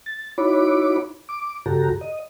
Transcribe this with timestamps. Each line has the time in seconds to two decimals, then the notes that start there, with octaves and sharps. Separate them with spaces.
0.06 A6
0.38 D#4 E4 F#4 C#5 B5 D6
1.29 D6
1.66 G2 C#3 F#4 G4 A4 A#5
2.01 D#5